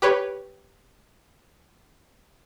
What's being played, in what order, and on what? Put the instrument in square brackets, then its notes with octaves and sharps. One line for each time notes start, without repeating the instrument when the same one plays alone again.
[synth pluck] G4 B4 C#5